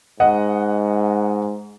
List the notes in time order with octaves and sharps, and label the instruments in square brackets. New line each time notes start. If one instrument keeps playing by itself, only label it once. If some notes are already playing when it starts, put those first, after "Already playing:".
[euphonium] G#2 [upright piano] D#5 F#5